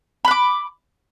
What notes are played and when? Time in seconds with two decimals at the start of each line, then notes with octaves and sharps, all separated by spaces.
0.25 B5
0.28 F#6
0.31 D6